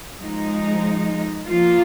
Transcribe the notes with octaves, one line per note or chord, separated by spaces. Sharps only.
F3 G#3 D#4
F3 A#3 F4